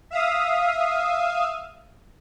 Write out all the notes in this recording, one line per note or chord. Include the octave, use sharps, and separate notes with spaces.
E5 F5 D#6